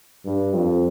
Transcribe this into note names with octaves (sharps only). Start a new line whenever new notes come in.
G2
F2